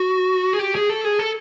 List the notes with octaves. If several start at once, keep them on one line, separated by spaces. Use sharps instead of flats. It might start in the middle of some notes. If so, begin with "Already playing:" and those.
Already playing: F#4
G#4
G4
G#4
A4
G#4
A4